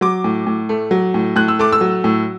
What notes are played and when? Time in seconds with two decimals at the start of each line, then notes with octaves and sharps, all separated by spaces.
0.01 F#3 D6
0.24 A2
0.47 A2
0.69 A3
0.91 F#3
1.14 A2
1.36 A2 F#6
1.48 E6
1.59 A3 D6
1.72 E6
1.81 F#3
2.04 A2